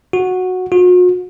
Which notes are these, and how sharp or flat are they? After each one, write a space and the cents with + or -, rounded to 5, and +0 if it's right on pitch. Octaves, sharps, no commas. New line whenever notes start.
F#4 -10
F#4 -45